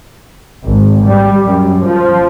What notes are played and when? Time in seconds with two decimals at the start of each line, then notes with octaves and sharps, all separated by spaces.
0.65 G#1
1.06 G3
1.44 F#2
1.85 F3